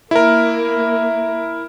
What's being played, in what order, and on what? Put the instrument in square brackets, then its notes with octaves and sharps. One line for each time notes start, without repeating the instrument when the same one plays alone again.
[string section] A#3 [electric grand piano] E4 A#4